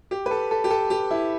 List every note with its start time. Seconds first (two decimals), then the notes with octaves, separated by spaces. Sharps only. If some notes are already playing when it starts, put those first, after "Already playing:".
0.11 G4
0.26 B4
0.31 A4
0.51 A4
0.64 G4
0.70 A4
0.90 G4
1.11 E4